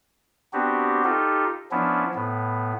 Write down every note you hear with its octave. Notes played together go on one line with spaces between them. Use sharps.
B3 C4 D4 F#4 G4
D#4 F4 G4 A4
F3 B3 C#4 D4 E4
A2 B3